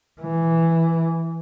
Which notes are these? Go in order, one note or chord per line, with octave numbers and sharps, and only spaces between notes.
E3